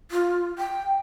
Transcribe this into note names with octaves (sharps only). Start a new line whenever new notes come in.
F4
G5